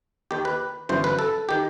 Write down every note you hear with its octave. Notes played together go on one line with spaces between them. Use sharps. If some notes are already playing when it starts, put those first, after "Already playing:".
D#2 D#3 G4
B4
G1 F#2 E3 C5
B4
A4
D#3 G4